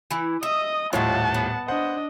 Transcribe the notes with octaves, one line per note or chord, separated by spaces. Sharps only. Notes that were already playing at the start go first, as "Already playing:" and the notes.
E3 E4
D#5 E5 D#6
D#1 A2 F3 G#3 F4 C#5 F#5 A5
B3
D4 C5 D#5 F#5